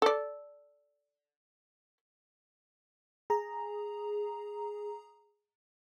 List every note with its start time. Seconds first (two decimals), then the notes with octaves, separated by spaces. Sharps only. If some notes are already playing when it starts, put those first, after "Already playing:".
0.02 A4 D5
3.30 G#4 A#5